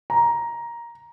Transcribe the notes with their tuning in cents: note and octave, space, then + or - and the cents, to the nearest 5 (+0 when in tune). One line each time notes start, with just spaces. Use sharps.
A#5 +10